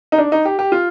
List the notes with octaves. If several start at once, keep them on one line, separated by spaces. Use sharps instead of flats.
D#4
D4
D#4
G4
G4
F4